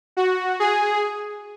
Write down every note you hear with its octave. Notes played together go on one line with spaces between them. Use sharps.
F#4
G#4